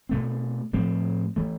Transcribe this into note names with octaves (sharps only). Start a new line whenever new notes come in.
B2 A3 C4
A2 F3 A3 C4
E3 A3